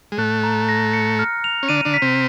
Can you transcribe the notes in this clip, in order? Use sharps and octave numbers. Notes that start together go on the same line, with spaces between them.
G#3
A2 A3 F#6
A#5
A#6
C#7
F6
F7
C#4
D3 D4 D#7
D3 D4
B6
C3 C4